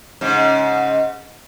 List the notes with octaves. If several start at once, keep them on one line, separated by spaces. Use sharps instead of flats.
G#2 C#3